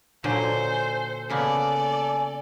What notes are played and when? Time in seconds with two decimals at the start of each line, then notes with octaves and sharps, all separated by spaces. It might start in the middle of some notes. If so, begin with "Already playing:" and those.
0.24 A#2 D3 F#3 A4 C5 G#5
1.30 C#3 A#3 B3 A4 D5 G#5